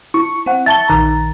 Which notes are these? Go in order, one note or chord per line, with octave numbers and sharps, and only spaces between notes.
E4 C#6
C4 F#5
E5 A5 C#6 A6 G7
A#1 D#3 A#5